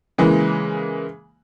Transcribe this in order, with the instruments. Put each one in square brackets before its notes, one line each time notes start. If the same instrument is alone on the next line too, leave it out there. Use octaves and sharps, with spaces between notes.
[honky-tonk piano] C#3 E3 G#3 A#3